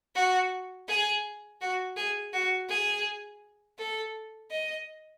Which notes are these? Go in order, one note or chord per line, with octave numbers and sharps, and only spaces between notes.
F#4
G#4
F#4
G#4
F#4
G#4
A4
D#5